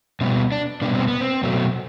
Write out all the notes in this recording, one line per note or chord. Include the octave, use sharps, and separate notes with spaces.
B2 G3 B3 C4
D4
B2 G3 B3 D4
C4
B3
C4
B2 F#3 A3